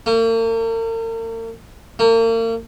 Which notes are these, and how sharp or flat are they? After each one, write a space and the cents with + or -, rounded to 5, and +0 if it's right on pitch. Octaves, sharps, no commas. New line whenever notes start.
A#3 -45
A#3 -40